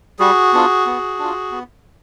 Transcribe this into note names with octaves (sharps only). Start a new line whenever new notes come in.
G3 F#4 G#4
B3 D4 F4
B3
D4 F4
B3